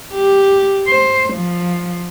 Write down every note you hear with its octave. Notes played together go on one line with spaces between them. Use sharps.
G4
C5
F3